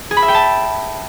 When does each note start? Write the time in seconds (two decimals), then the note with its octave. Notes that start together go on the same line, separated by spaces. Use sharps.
0.11 G#4
0.17 B5
0.22 E5
0.28 G5
0.34 A5